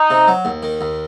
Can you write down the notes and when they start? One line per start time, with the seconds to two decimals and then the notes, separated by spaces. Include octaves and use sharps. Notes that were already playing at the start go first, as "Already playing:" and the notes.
Already playing: D#4
0.10 C3
0.28 F#3
0.45 D#2
0.63 D#3
0.81 D#2